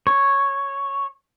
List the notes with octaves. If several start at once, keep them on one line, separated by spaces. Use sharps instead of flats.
C#5